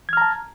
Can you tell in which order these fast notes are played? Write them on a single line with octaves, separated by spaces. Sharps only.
G#6 F6 A#5 A5